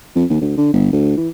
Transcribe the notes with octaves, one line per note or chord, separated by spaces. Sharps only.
F2
D#2
D2
D3
G1
D2
E3